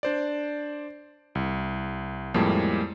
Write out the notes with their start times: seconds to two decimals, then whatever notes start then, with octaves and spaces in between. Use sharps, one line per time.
0.03 D4 C5 D5
1.35 C2
2.34 F2 A2 G3 G#3 A#3